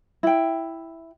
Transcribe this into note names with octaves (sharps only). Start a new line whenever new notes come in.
E4 G5